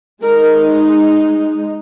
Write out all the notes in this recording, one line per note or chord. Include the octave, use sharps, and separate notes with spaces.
G#3 D#4 A#4